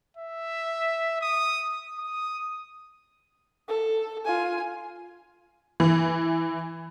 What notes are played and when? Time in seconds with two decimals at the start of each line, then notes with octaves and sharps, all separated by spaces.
0.17 E5
1.21 D#6
1.98 D#6
3.68 A4
4.25 F4 G#5
5.80 E3